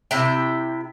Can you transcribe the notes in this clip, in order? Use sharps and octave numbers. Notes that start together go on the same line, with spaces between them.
C3 E4 G5